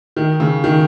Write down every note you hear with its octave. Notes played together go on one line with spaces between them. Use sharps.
D#3
C#3
D#3